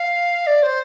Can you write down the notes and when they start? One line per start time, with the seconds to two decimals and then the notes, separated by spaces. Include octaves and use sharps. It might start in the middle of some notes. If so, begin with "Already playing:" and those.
Already playing: F5
0.46 D5
0.62 C5